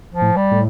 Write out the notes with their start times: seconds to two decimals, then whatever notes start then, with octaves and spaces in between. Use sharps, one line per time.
0.14 F3
0.22 A2
0.36 G3
0.52 A2